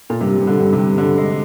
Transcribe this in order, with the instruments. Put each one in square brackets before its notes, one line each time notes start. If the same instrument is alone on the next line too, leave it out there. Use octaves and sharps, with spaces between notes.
[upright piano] A#2
[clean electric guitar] G2 [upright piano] C3
[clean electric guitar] G2
[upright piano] D3
[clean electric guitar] G2
[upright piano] C3
[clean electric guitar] G2
[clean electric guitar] G2 [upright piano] D3
[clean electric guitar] G#3